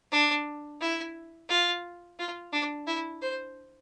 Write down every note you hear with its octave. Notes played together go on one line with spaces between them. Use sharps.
D4
E4
F4
F4
D4
E4
C5